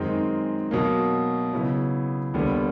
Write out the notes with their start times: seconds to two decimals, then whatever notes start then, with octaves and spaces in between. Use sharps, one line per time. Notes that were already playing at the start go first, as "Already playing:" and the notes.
Already playing: F#2 D#3 G#3 C4 D#4
0.71 B2 F#3 A#3
1.53 C#3 F#3 B3 E4
2.34 D#2 D3 G3 B3